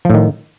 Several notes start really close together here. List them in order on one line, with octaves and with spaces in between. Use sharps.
F3 A2 D#3